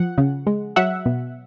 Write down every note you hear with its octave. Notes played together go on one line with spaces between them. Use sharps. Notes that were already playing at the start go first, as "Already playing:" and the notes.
Already playing: F3 F#5
C#3
G#3
F#3 E5 F#5
B2